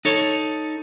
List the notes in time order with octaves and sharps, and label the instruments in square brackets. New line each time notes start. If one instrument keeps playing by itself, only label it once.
[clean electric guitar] D#4 A4 C#5